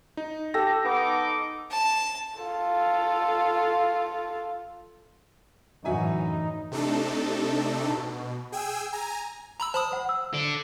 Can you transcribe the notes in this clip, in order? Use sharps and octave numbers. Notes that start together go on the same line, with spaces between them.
D#4
G4 A4 A#6
B3 D#4 D6
A5
F4 A4
F#2 A2 D3 E3 D#4 F#4 E5 G#5
C3 A3 D4 D#4 A4
B2
G#4 G5 G#5 E6
G#5 A#5
A#5 B5 E6
C5 A5 B5 D#6
C5 F#5
E6
A4 D5